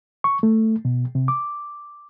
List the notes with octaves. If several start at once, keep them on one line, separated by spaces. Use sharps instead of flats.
C#6
A3
B2
C3
D6